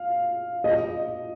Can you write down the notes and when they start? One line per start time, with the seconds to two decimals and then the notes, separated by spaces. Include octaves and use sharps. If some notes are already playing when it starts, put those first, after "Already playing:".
Already playing: F5
0.64 D#5